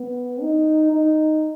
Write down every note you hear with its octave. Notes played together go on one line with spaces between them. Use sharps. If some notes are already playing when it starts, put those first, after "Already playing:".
Already playing: B3
D#4
D#4